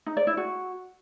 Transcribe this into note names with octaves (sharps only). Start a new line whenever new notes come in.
D#4
D5
E4
F#4